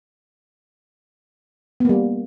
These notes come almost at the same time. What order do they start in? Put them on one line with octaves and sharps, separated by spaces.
B3 A#3 G3